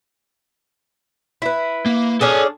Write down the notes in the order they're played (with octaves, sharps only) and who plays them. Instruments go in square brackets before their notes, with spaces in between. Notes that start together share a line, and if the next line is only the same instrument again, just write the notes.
[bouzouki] E4 B4
[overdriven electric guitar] A#3
[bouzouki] C#4 D4 G#4 [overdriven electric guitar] A4 G#5